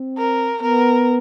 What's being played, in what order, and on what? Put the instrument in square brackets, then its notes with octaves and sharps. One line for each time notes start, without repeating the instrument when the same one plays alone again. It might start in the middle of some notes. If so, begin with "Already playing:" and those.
Already playing: [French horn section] C4
[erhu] A#4
[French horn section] B3 [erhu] A#4